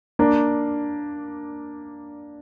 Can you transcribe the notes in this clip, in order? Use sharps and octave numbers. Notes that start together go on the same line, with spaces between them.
A#3 D4